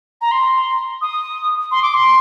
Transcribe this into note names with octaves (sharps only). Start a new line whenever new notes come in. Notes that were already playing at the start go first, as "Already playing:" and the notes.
A#5
C6
D#6
C6
D6
C6